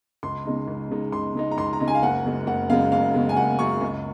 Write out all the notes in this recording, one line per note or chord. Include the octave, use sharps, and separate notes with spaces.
C#2 C6
C#3 G#3 D#4
C#2
C#3 G#3 D#4
C#2 C6
C#3 G#3 D#4
A#5
C#2 C6
A#5
C#3 G#3 D#4
G#5
F5
F#1 F#5
F#2 C#3 G#3
F#1 F#5
F#2 C#3 G#3 F5
F#1 F5
F#2 C#3 G#3
G#5
F#1 F#5
F#2 C#3 G#3 C#6
C#2